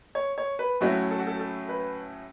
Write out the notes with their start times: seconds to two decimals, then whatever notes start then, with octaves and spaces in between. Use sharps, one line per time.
0.15 C#5
0.38 C#5
0.59 B4
0.81 A2 F#3 A3 C#4 E4 F#4
1.11 A4
1.19 F#4
1.27 A4
1.40 A4
1.69 B4